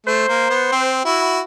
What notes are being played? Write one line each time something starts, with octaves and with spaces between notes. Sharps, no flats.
A3 C5
A#3
B3
C4
E4 F#4